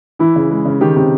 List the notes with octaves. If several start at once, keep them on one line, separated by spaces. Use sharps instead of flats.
E3 E4
C#3
G#3
C#3
D#3 G4
C3